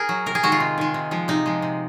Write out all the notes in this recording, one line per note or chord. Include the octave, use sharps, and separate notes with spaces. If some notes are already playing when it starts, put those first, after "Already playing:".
Already playing: G#4 A#4
F#3
C3 A#4
G#4
D#3 G#3 F#4
F4
C3
D#3 G#3
C3
F3 G#3
C3 D#4
F3 G#3
C3